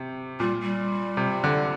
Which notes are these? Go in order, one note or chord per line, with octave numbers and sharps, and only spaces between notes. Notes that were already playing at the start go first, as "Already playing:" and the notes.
Already playing: C3
A#2 G3
G3
C3
D3